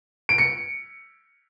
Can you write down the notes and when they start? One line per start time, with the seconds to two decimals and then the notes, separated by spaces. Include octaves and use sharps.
0.29 D7
0.38 C#7